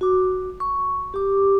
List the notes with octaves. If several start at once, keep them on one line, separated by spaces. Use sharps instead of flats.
F#4 D6
C#6
G4 D6